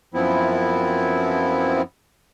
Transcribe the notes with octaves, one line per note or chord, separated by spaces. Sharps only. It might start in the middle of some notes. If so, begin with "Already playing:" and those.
F#2 F3 B3 C4 E4